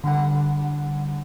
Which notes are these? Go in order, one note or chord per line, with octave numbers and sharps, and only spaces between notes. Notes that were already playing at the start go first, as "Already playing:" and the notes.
D3 G3 F#5